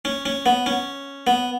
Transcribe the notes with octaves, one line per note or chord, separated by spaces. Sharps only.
C#4
C#4
B3
C#4
B3